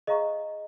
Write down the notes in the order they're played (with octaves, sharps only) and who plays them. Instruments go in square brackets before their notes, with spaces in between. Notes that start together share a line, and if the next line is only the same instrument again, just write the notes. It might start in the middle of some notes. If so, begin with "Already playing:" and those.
[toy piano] G#4 C5 F5 A#5 C#6 [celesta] D#5